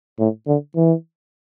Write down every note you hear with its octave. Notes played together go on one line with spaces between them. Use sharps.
A2
D3
E3